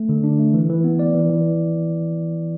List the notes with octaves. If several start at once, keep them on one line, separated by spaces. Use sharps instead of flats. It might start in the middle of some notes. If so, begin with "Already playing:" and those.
Already playing: A3
D3
D4
A3
E3
E3
B3
D5
E3
E3